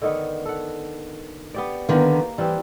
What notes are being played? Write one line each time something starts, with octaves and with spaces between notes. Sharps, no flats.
D3 D#3 B3
A4 F#5
B3 G4 D5
D3 D#3 A#3 B3
E3 G3 C4 G4